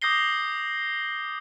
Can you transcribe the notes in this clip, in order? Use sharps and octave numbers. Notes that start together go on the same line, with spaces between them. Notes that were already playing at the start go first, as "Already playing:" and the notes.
D6 D#6 G6 A#6 C7 G7